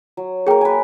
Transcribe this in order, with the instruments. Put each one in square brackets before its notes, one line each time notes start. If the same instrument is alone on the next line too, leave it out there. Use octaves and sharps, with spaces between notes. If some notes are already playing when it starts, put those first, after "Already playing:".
[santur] F#3
[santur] A#3 A#4 [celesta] G#4 G5
[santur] B4 G#5